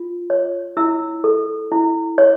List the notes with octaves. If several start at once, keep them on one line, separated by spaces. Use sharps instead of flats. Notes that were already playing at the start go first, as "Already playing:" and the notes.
Already playing: F4
C#5
E4 E6
A4
E4
C#5